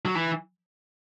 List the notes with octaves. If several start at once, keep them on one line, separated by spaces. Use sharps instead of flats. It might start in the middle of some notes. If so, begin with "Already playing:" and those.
F#3
E3